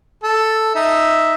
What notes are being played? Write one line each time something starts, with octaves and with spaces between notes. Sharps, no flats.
A4
D#4 E5